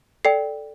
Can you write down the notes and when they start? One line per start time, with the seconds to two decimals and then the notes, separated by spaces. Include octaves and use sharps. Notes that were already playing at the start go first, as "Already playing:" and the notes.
0.25 A4 D5 G5 C7